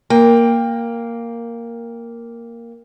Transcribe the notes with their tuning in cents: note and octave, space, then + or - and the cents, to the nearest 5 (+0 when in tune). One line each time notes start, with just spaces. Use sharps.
A#3 +0 G5 +20